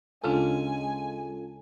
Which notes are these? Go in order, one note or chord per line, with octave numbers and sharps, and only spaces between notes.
D2 C#3 G#3 C#4 D4 F4 A4 G#5